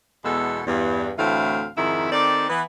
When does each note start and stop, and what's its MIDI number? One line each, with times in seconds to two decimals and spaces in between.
0.25 0.62 40
0.25 0.62 47
0.25 0.62 56
0.25 0.62 69
0.66 1.10 40
0.66 1.10 43
1.18 1.67 38
1.18 1.67 45
1.18 1.67 52
1.18 1.67 60
1.18 1.67 77
1.77 2.08 41
1.77 2.08 44
1.77 2.08 51
1.77 2.08 64
2.12 2.47 51
2.12 2.47 60
2.12 2.47 69
2.12 2.47 74
2.49 2.61 52
2.49 2.61 59